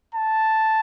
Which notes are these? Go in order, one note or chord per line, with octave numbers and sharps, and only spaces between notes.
A5